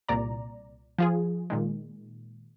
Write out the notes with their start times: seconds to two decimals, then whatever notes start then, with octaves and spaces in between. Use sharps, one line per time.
0.09 C2 A#2 D5 A#5
0.98 F3 F4 G#4
1.50 A#2 D#3 G#3